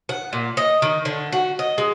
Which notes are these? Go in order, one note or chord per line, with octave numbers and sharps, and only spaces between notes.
F#5
A#2
D#5
D#3
D3
F#4
D#5
G#3